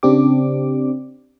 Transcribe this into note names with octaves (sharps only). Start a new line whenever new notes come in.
C#3 C4 D4 G4 D6